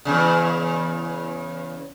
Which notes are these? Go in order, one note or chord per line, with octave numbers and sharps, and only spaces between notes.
E2 G2 C#3